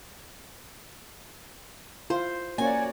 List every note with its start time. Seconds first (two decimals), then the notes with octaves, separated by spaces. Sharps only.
2.10 E4 F4 C5
2.58 A#3 C#4 F#4 C#5 D5 G#5